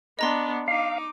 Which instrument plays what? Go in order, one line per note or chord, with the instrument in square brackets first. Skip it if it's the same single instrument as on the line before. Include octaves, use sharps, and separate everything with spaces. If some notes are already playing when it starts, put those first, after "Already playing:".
[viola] B3 D4 [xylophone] D#5 A#5 C6
[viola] D#4 D6 [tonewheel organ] F5